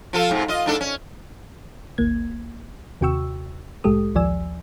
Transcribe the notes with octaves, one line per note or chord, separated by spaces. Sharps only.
F3 F4 A4
G#2 C3
F4 D#5
G#2 D4 A4
C#4
G#1 D2 A#3 G#6
D#2 C3 F#4 G5 C#6 E6
C2 A2 G#3 G4 A4 D#6
A#1 D#2 F3 D5 G#5 E6